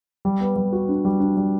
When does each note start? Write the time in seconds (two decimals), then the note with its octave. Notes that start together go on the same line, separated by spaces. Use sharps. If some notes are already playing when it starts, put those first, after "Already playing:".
0.25 G3
0.41 B3
0.56 G3
0.72 F#4
0.88 D4
1.05 G3
1.20 D4
1.37 G3